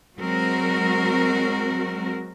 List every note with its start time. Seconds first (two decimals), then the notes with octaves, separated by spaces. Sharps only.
0.18 F#3 G#3 C4 F#4 A#4